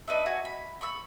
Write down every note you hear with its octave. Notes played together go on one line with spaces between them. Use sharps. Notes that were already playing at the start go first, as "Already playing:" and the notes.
D4 D#4 B4 E5
F#4 G#5
B5
B5 C#6 E6